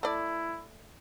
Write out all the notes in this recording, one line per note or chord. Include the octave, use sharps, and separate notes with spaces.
A3 E4 D5